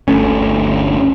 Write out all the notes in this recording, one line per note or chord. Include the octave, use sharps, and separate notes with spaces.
G1 D2 A3 C#4